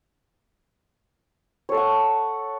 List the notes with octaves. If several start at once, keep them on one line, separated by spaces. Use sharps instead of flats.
A4 C#5 F#5 C#6